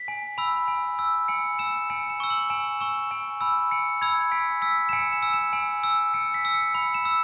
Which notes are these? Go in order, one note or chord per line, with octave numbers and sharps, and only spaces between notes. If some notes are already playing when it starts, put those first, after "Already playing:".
Already playing: B6
G#5
B5 E6
G#5
E6
G#5 C#7
E6 E7
G#5 C#7
E7
C#6 E6
F#7
G#5 E7
C#6 E6 E7
G#5
B5 E6
G#5 C#7
B5 E6 G#6
G#5 B6
E6 B6
E7
G#5 C#7
E7
E6
E7
G#5
E6
G#5 C#7
B6
E6
C#7
B5 C#7
E7
E6